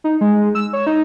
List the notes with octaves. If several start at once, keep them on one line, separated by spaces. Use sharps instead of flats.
D#4
G#3
E6
C#5
D#4